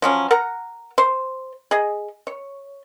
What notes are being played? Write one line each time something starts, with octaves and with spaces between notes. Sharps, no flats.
F3 F#3 C#4
A#4 F#5 A#5
C5
G#4 D#5
C#5